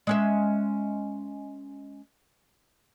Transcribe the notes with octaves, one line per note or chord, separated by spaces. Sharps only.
G#3 C#4 E5